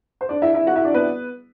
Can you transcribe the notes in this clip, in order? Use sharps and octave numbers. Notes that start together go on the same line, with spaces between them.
C5
D4 D5
E4 E5
E4 E5
F#4 F#5
E4 E5
D4 D5
B3 B4